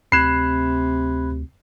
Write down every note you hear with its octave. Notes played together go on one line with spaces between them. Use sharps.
D2 C3 B5 F#6 G#6 C7 E7